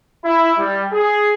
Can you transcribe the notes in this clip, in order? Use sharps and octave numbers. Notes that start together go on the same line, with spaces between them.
E4
G3
G#4